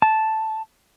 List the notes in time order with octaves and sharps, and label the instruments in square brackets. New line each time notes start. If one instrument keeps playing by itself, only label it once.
[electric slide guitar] A5